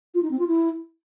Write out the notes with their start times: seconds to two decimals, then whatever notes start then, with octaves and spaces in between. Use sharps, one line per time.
0.14 F4
0.23 D#4
0.31 C4
0.39 F4
0.47 E4